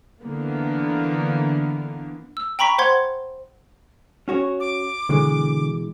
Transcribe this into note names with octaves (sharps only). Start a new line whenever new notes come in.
D3 E3 A#3 B3
E6
G5 A#5 B5 C#6 B6
C5 F#5 C6 G#6
C#4 F#4 C#5
D6
B2 D3 E3 G#3